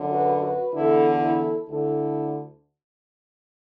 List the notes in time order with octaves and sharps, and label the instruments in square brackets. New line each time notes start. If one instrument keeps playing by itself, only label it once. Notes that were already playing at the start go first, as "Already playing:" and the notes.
Already playing: [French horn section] F#2 D3
F#4 B4
F#4 B4
E2 D3 E4 A4
E4 A4
D2 D3 E4 A4